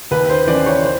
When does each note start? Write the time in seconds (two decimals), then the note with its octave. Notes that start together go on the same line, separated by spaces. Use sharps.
0.11 D#2 B4
0.30 C5
0.47 C#3 E3 D5
0.66 C#5
0.84 C5